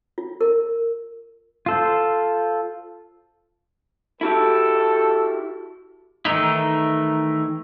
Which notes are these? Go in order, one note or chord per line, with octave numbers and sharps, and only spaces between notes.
F4
A#4
F4 A4 C5
E4 F#4 G4 A4
D#3 E3 A3 D#4 E4